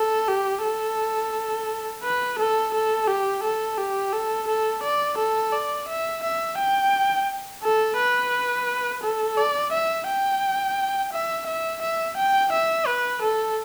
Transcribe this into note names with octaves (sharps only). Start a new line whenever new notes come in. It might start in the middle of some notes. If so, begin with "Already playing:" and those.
Already playing: A4
G4
A4
B4
A4
A4
G4
A4
G4
A4
A4
D5
A4
D5
E5
E5
G5
A4
B4
A4
D5
E5
G5
E5
E5
E5
G5
E5
B4
A4